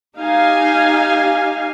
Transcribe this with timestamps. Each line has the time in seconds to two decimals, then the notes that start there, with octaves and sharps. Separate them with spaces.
0.17 D#4 G4 F5 G#5